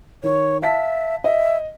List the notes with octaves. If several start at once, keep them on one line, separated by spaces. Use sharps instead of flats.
D#3 C#5
E5 F5 A5 B6
D#5 E5